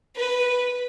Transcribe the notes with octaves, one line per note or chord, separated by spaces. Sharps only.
B4